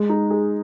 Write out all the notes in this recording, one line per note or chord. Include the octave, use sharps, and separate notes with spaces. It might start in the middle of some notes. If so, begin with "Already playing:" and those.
Already playing: G#3
D#4
G#4